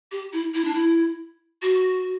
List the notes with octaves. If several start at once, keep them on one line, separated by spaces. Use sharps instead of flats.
G4
E4
E4
D4
E4
F#4